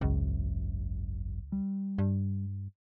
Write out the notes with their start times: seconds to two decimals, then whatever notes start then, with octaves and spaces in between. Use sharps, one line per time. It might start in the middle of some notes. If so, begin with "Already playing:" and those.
0.01 G#1 C#2 F#2
1.52 G3
1.98 G2